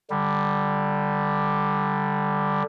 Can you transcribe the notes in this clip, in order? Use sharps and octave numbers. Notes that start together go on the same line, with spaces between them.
D3 G3